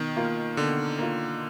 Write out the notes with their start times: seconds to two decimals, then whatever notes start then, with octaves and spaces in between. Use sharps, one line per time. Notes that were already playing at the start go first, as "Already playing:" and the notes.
Already playing: B2 D#3
0.16 A#3 F4
0.57 B2 D3
0.98 A#3 F4